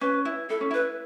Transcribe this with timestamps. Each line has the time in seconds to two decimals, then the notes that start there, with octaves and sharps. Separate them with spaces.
0.01 C#4 B4
0.25 E4
0.50 E4 A4
0.61 C#4
0.71 E4 B4